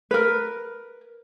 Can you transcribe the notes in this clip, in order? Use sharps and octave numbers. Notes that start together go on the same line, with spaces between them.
A#4 B4